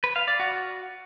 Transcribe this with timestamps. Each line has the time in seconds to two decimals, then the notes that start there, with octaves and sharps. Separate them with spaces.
0.04 B4
0.16 F5
0.28 D5
0.40 F#4